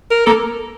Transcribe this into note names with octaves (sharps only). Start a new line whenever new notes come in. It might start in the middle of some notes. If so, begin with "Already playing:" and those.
A#4
A#3 A4